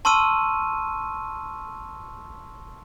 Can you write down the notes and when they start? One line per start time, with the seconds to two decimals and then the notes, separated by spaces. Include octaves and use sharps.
0.05 A5 C6 C#6 E6 F6 D#7